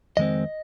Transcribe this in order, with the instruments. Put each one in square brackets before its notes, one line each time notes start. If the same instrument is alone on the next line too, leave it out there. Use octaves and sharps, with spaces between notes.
[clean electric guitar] F2 D#3 G#3 C4 D#5